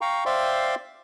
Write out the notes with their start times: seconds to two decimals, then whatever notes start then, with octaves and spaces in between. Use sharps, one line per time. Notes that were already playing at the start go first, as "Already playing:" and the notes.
0.01 F5 G5 A#5 C#6
0.26 C5 D5 E5 F5 G5 C6